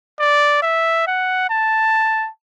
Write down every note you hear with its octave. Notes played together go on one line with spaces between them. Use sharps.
D5
E5
F#5
A5